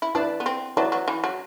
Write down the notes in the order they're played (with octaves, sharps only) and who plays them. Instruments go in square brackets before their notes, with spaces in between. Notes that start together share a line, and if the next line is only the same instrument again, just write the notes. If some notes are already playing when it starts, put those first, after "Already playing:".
[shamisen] E4
[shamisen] D4 [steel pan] E4 B4 D5 A5
[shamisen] B3
C4
[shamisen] F#3 [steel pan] E4 B4 D5 A5
[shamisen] F#3
E3
F#3